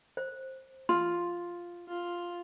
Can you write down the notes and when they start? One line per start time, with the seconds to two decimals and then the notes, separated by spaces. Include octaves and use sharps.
0.17 C5
0.89 F4 C6
1.88 F4